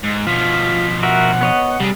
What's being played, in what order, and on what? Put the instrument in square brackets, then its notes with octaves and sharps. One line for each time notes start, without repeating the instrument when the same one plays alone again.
[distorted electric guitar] G#2
[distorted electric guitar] B2 F3 [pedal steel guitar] F4 [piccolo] B6
[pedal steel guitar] F#4 A#4 E5 [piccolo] F#5
[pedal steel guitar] B3 C#5 D#5
[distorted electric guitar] C3 G#4 [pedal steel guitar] G3